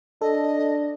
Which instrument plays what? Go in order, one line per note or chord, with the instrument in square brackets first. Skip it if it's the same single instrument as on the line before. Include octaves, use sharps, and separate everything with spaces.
[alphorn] D4 [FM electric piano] A4 [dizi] D#5